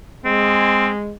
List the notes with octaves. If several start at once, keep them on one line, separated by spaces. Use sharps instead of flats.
G#3 C4